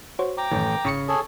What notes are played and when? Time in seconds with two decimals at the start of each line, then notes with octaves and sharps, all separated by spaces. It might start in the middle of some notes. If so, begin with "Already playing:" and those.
0.19 F#4 C5 C#5
0.38 G5 A#5 D6
0.52 A1 F#2 D#3
0.85 G#1 C#3 C#6 C#7
1.08 G#4 A4 C#5